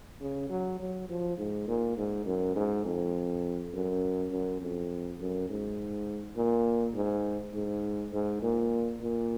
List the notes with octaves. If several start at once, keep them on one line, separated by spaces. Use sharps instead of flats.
C#3
F#3
F#3
F3
G#2
A#2
G#2
F#2
G#2
F2
F#2
F#2
F2
F#2
G#2
A#2
G#2
G#2
G#2
A#2
A#2